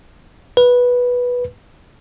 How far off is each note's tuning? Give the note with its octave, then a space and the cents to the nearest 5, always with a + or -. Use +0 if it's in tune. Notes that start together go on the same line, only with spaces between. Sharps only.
B4 -10